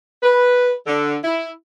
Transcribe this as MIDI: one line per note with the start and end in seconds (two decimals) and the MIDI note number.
0.23 0.73 71
0.87 1.16 50
1.24 1.50 64